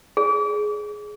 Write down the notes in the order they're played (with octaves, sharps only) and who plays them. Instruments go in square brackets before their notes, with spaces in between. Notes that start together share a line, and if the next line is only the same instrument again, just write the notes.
[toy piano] G#4